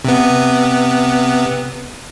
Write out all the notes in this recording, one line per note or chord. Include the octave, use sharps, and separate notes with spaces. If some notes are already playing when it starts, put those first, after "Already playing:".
C3 B3